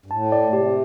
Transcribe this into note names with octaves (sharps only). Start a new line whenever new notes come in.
G2
A2 A5
D5
C3 G4